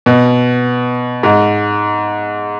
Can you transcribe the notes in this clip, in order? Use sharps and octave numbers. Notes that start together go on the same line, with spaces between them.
B2
G#2